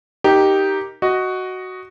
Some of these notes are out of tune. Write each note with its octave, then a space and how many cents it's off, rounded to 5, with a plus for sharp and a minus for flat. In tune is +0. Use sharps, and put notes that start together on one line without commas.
D#4 +5 G4 -5 A#4 -10
F#4 +5 D#5 +0